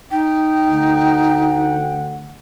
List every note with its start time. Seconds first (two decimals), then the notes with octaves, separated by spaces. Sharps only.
0.11 D#4 G5
0.68 D2 F#5